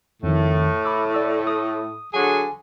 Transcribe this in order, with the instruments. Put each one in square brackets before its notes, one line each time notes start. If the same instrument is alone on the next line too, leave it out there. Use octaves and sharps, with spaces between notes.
[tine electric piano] F2 D#3 [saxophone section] A2
[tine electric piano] B5 D6 E6
D5 E6
D#6
[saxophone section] D3 F#3 G#4 [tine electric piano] G#5